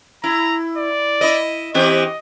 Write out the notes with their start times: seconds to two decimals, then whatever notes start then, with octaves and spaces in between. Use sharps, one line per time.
0.24 E4 A#5
0.77 D5
1.21 E4 D#5
1.74 E3 C4 G4 D#5